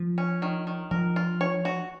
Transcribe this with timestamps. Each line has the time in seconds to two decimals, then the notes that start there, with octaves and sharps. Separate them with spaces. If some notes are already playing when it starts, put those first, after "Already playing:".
Already playing: F3
0.18 C#4
0.42 D#3
0.67 D#3
0.91 F3 A#4
1.16 F4
1.41 C#5
1.65 F#4